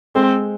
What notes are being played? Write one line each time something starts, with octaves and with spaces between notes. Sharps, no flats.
G#3 C4